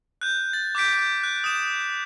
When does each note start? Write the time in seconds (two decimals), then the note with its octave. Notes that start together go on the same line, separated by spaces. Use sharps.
0.21 F#6 G6
0.53 A6
0.75 D6 F#6 G6 B6 D7
1.23 F#6
1.44 D#6 E7